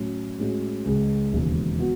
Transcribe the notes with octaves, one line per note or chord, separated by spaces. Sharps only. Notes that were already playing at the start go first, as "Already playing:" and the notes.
Already playing: A2 F#3 C#4
A2 G#3 C#4 F#4
C#2 C#3 G#3
E1 D#2 C#3
B3 F#4